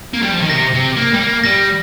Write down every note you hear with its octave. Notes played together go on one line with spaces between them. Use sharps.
A#3
G3
F3
D#3
C3 A#6
C3
A#3 A#6
G3
A#3
G3 A#6